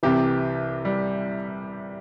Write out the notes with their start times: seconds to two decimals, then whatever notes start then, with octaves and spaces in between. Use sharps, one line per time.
0.03 C2 C3 E3 G4
0.85 G3